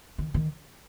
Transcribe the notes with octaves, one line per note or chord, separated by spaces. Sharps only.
D#3
D#3